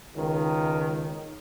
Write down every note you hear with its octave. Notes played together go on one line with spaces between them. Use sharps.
C#2 D#3